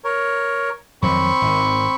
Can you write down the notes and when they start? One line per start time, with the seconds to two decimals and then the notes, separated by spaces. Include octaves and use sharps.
0.04 A#4 C#5
1.02 F2 D#3 F#3 C4 B5 C#6
1.42 G#1 D#3